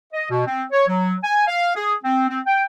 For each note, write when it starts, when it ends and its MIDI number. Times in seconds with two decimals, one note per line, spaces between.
0.13 0.27 75
0.30 0.45 47
0.47 0.64 60
0.72 0.84 73
0.88 1.15 54
1.24 1.47 80
1.48 1.73 77
1.75 1.95 68
2.04 2.29 60
2.29 2.40 60
2.47 2.64 79